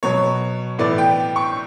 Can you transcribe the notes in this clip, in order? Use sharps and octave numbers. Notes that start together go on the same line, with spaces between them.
B2 F#3 B3 C#5
A2 E3 B3 E4 D5
G5
C#6